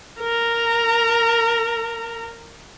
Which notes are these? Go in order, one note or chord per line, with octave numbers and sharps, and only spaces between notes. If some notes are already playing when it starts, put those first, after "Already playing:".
A#4 A#5